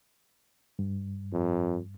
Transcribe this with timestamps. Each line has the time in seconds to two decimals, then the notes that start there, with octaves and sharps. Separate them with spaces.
0.79 G2
1.33 F2